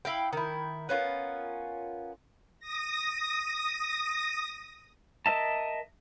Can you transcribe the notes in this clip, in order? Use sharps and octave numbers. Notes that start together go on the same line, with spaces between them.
E4 F5 G5
D#3 E4
B3 C#4 F4 A#4
D#6 A#6
A#4 D#5 E5 A5